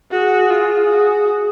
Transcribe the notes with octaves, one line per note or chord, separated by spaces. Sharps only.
F#4 G#4
F4
F#4